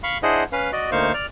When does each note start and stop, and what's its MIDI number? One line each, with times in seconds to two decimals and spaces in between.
0.03 0.18 77
0.03 0.18 83
0.03 0.18 85
0.23 0.44 62
0.23 0.44 64
0.23 0.44 68
0.23 0.44 72
0.23 0.44 75
0.23 0.44 78
0.52 0.71 61
0.52 0.71 71
0.52 0.71 77
0.72 0.90 66
0.72 0.90 74
0.72 0.90 75
0.92 1.12 38
0.92 1.12 58
0.92 1.12 63
0.92 1.12 72
0.92 1.12 77
0.92 1.12 85
1.14 1.26 74
1.14 1.26 89